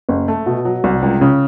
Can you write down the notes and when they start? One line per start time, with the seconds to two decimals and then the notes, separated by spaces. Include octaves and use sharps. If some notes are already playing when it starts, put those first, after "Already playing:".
0.09 F#1
0.28 A3
0.46 B2
0.65 F#3
0.84 C2
1.02 C#2
1.21 C#3